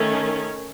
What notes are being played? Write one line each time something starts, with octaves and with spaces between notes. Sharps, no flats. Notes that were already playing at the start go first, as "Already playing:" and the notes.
Already playing: D#3 A3 C#4